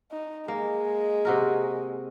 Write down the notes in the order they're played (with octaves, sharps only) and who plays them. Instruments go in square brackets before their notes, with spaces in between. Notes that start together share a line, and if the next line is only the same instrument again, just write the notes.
[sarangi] D#4
[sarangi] G#3 [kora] A#3
[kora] C3 F#4 A#4